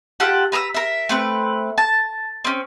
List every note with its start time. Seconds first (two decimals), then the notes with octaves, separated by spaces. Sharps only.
0.20 F4 G4 A4 F#5
0.52 B4 A#5 D#6 E6
0.74 A#4 E5
1.09 A3 C4 B4
1.78 A5
2.45 C4 C#4